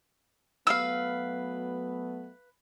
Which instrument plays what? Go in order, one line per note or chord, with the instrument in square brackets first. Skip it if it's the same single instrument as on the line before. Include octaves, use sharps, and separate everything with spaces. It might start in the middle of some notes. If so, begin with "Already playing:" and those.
[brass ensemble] F#3 A3 B3 [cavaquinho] B4 F5 [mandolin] E6